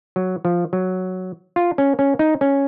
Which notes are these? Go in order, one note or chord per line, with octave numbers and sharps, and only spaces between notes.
F#3
F3
F#3
F4
C#4
C#4
D#4
C#4